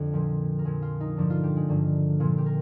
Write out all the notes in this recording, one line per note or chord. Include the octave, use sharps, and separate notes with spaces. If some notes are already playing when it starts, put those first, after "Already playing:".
Already playing: F2 D3
A#2 F3
A#4
A#2 F3 G#4
F4
D#4
G2 D3 F3 D4
F4
G4
G#3
G2 D3 F3 A#3
A#2 F3 F4
G4
A#4